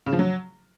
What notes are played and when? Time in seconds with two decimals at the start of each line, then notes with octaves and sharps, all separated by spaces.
0.06 C#3
0.13 F3
0.19 F#3